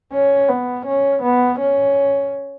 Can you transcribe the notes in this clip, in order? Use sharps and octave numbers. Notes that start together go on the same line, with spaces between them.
C#4
B3
C#4
B3
C#4